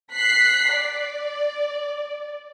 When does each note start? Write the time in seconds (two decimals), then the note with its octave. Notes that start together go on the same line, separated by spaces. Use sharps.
0.13 F#6 B6 C7
0.72 D5